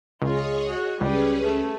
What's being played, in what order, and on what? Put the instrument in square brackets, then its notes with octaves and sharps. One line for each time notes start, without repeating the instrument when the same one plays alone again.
[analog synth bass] C#2 [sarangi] F4 [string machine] G#4 C#5 D#5
[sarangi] F#4
[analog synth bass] C#2 [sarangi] G3 [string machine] C#4 G#4 B4
[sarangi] A3